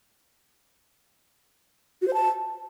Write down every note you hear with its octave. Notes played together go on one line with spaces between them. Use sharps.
F#4
C5
A5